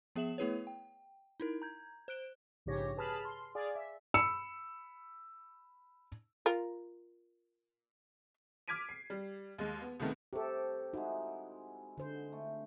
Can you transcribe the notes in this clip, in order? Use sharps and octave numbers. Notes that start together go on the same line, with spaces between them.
F3 B3 G#4 E5 E7 F#7
A3 B3 E4 G#4 B4 C#5
G5
D#4 E4 A#4
A#5 G6 G#6
C5 F#6 D7 G7
A#1 G#2 C#3 G4 C#5 A#6
G#4 B4 A5 B5 F6
C6
G#4 D5 F5 G#5
E5
B5 E6 C#7 E7
F4 A#4
D6 F6 G#6 B6 D7 D#7
C7
G3
D#2 G#3
B3
C#2 C3 D#3 A3 B3
C3 G4 A4 C#6
G#3 D#4 E4 F#4
D3 C5
A3